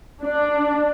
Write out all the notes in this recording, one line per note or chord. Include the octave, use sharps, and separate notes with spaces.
D4